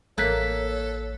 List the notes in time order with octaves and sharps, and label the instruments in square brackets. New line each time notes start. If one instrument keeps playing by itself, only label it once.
[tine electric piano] A1 F#6 B6 [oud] A#3 [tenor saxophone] A4 [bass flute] C#5